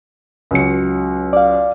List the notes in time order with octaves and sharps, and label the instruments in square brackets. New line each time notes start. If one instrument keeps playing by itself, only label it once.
[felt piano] C#2 F#3 C#7
[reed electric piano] D5 F5